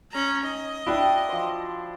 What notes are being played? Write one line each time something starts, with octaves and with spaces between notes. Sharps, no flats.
C#4 A#5
D#4 D#5
D4 E4 F#4 G5
F3 C5